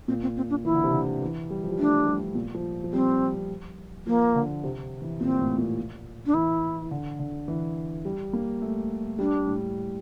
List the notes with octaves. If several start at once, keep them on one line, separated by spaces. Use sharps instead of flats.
A#2 C4
C4
C4
D4
E3 E4
D3
C3
D3
E3
G3
F3
G3
A3 D4
G3
A#2
F3
F3
G3 C4
F3 A#3
D3
C3
E3
A#2 C4
A2
A#2
D4
E3 E4
D3
D3
E3
G3
A#3
A3
G3 D4
A2